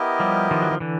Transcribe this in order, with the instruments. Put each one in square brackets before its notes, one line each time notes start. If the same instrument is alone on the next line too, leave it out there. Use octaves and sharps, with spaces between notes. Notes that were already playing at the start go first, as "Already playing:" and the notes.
Already playing: [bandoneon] B3 E4 G4 A#4 D#5
[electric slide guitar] F3 G3
D#3 F3
F#3
F3
D3 E3